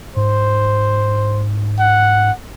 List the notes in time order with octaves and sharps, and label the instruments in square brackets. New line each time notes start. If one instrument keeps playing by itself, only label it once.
[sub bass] G#2 [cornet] C5
[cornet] F#5